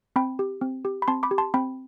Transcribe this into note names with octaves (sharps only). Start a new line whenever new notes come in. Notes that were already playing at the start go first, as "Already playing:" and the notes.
C4 G5 B5
G4
C4
G4
B5
C4 A5 C6
B5 D6
G4
A5 C6
C4 G5 B5